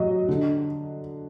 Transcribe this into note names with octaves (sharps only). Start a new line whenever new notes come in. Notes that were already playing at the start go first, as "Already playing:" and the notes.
Already playing: F#3 D#5
D3